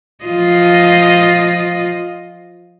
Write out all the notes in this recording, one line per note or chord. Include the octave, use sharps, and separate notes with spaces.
F3 F4 D#5